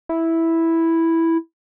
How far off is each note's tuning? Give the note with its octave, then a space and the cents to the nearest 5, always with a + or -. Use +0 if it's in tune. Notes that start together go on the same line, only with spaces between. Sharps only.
E4 -5